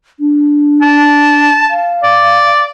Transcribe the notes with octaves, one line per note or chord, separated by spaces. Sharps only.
D4
A5
F5
D5